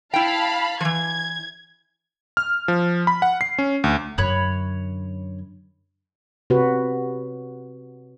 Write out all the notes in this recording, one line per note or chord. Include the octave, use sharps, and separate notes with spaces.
E4 F5 G5 A5 B5
E3 F3 G#6
F6
F3
B5
F#5
C7
C#4
D2
F#2 D3 C#5 B5 F#6
C3 F#4 B4